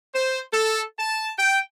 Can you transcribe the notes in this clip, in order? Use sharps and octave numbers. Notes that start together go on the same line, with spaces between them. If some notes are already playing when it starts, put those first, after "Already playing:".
C5
A4
A5
G5